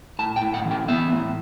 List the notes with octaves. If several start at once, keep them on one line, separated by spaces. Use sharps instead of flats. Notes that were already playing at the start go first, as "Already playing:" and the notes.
A2 A5
G5
A2
F#5
E3
G5
B3 E5
A2